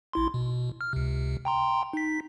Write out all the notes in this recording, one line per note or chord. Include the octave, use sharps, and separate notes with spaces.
A1 E4 C6
B2
F6
C#2 C3
G5 A#5 C6
D#4 B6